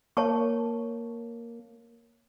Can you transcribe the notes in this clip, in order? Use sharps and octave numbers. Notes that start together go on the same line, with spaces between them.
A#3 C#5 A5 C#6